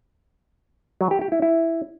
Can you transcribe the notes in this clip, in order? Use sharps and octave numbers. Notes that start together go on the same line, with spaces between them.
F#3
G4
G4
E4
E4